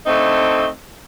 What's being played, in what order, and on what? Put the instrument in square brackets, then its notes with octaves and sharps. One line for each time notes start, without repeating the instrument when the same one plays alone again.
[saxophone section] D3 A3 C4 D#4